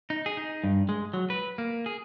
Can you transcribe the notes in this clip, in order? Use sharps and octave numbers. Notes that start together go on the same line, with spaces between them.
D#4
G#4
D#4
G2
G#3
F#3
B4
A#3
G#4